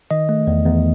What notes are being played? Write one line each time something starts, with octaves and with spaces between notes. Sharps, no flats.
D#3 D#5
A3
E2
E2